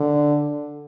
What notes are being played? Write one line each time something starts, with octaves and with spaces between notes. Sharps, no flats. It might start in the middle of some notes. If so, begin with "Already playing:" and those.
Already playing: D3